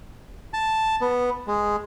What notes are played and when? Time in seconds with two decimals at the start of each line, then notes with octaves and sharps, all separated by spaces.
0.53 A5
1.01 B3
1.47 G#3